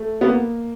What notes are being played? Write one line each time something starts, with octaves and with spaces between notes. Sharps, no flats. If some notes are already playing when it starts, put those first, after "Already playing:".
Already playing: A3
B3
A#3